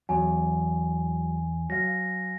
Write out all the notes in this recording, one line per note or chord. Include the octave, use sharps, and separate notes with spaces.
E2 F#3 G#5
F#3 F5 A#6